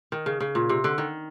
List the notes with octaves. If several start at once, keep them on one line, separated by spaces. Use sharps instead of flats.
D#3
C#3
C#3
A#2
C3
D3
D#3